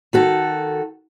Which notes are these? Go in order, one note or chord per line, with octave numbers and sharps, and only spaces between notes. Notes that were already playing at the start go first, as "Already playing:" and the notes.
D#3 F#4 A4